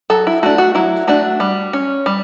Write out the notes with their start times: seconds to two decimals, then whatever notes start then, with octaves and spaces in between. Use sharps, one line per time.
0.10 F#3 A4
0.27 E4
0.43 A3 D4 F#4
0.58 F#4
0.75 F#3 E4
1.08 A3 D4 F#4
1.40 G3
1.73 C#4
2.06 G3